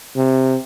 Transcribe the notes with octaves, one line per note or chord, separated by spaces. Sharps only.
C3